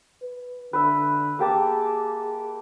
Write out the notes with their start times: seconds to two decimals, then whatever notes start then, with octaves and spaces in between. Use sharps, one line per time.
0.22 B4
0.73 D3 B4 E5
1.39 A#3 G4 G#4 A5